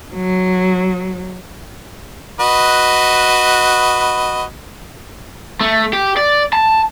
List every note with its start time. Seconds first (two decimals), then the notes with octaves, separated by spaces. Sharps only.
0.14 F#3
2.40 F#4 B4 D#5
5.61 A3
5.93 G4
6.17 D5
6.53 A5